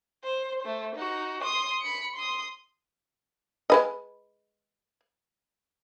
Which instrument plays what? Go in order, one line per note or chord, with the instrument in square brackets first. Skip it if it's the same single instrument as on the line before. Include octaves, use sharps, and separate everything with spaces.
[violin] C5
A3 C5
D#4 F#4
C6 D#6
B5 C#7
C6 D#6
[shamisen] G#3 B4 D#5